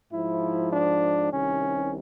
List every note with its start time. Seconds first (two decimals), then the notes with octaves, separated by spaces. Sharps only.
0.13 G#2 F3 E4
0.72 D4
1.31 C2 C3 D#3 C#4